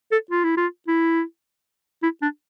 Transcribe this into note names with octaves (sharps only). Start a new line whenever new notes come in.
A4
F4
E4
F4
E4
E4
D4